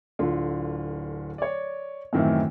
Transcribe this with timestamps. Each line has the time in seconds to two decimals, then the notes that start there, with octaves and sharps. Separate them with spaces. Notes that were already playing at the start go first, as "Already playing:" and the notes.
0.19 D1 D3 F4
1.38 C#5 D5
2.13 F#2 A2 D#3 E3 C4 E4